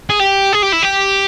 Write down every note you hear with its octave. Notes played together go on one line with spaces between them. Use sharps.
G#4
G4
G#4
G4
E4
G4